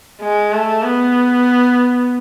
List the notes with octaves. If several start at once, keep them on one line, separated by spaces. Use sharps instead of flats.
G#3
A3
B3